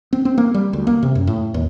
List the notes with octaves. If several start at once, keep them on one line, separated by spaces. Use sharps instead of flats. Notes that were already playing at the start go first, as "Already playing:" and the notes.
C4
C4
A#3
G3
D2
A#3
C3
F#2
A2
D#2